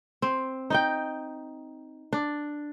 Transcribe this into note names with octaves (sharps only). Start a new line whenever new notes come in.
C4
D#4 D#5 G5
D4